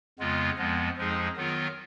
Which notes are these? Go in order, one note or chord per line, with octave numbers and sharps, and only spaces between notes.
F2 C#3 G#3 B3 F4
F2 F3 G#3 B3
F2 F3 G#3 D#4 G#4
D#3 F#3 B3 F4 A#4